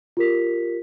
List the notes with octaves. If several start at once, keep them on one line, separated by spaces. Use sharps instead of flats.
F4 G4 A#4 B6